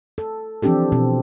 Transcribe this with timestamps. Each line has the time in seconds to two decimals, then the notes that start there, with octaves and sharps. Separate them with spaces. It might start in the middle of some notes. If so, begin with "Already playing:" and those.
0.18 A4
0.62 E3 F3 C4 D4 G4 A4
0.92 B2 C4